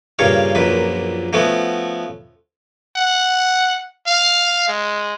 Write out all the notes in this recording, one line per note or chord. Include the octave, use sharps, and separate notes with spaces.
G2 A#2 C#3 C#5 F5
A#1 F#2 A#2 B4
F3 A3 B3 C#4 F#4
F#5
F5
G#3